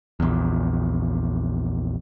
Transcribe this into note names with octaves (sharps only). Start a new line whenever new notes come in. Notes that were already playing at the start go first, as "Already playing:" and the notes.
A#1 E2